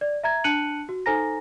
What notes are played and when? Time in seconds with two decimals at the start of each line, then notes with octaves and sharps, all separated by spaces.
0.01 D5
0.24 E5 A#5 G#6
0.44 D4 A5 F#6 C#7 D#7 F#7
0.89 F#4
1.06 D#4 A4 C5 G#5 A#5 A#6